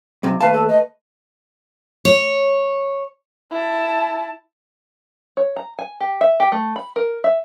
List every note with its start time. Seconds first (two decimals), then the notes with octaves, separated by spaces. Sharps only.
0.23 B1 F#2 C3
0.41 D#2 A3 B4 F5 A5
0.53 A4
0.69 D#5
2.05 C#5
3.52 E4 A5
5.37 C#5
5.56 A#5
5.79 G#5
6.01 G4
6.21 E5
6.40 G4
6.52 A3
6.76 B5
6.96 A#4
7.24 E5